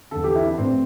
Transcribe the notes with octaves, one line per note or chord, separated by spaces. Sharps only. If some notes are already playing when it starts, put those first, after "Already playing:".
E2 D3 A4
G4
E4
D4
A2 E3 C4